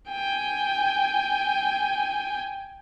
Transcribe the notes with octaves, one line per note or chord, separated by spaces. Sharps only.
G5 G#5